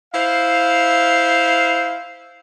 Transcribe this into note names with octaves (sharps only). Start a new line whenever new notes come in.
E4 C5 F5